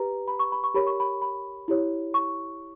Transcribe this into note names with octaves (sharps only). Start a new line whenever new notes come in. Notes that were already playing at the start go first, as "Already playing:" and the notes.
Already playing: G4 B4 A#5
B5
C#6
B5
C#6
G4 A#4 C#5 B5
C#6
B5
B5
E4 G4 C#5
C#6